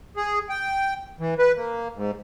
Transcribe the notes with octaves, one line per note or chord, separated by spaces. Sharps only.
G#4
G5
E3
B4
A#3
G#2